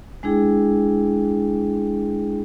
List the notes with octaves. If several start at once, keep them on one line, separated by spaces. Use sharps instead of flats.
G#3 D4 E4 G#4 G5